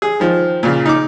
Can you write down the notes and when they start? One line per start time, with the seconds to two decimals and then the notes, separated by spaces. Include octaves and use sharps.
0.02 G#4
0.20 D#3 F3
0.63 A#2 C#3
0.85 D#4 D6